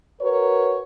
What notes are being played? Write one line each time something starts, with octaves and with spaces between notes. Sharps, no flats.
F#4 A#4 B4 C#5